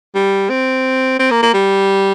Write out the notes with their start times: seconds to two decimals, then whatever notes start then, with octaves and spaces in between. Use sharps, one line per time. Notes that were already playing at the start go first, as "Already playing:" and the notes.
0.15 G3
0.50 C4
1.19 C4
1.31 A#3
1.42 A#3
1.54 G3